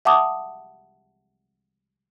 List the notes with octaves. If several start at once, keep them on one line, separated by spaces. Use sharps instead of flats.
E5 F#5 A5 D6 D#6